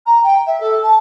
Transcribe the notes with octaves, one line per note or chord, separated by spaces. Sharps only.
A#5
G5
E5
A4
A5